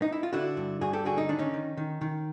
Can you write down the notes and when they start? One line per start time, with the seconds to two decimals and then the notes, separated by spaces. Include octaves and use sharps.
0.02 D#4
0.12 E4
0.23 F4
0.33 D3 E4 F#4
0.57 G2
0.81 G2 F#4 G#4
0.93 G4 A4
1.05 D3 F#4 G#4
1.18 D#4
1.29 D#3 D4
1.38 C#4 D#4
1.54 D#3
1.77 D#3
2.01 D#3